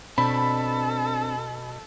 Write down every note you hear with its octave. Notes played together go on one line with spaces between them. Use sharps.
B2 C4 D4 A4 B5